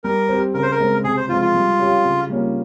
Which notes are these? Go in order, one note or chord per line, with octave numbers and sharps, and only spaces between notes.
G3 A#4
C4 G4
C#3 A#4
C5
A#4
G#3 C4
C3 G#4
C5
F3 G#3 C4 F4
F4
G3
C#4 G4 C#5 F5
C#3
G3 A#3 C#4 F4